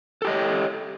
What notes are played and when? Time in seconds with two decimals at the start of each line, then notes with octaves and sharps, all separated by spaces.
0.22 A4
0.25 G4
0.27 D#5
0.30 C#5